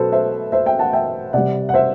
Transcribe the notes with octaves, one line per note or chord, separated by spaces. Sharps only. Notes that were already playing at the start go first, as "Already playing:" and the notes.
Already playing: B2 F#3 A4 B4 C5
C5 E5
C5 E5
E5 G5
F#5 A5
E5 G5
C3 G3 D5 F#5
F#5
C5 E5